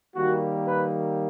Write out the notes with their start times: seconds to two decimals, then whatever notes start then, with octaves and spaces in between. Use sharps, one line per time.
0.14 D#3 G3 A#3 F#4
0.66 B4